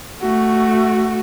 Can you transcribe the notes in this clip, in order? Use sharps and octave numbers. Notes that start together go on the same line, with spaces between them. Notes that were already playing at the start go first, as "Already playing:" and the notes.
A3 F#4